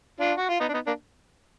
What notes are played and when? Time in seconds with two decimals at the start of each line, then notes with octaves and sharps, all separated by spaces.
0.20 D4 F4
0.38 F#4
0.49 F4
0.60 B3 D#4
0.69 D4
0.73 B3 D#4
0.87 A#3 D4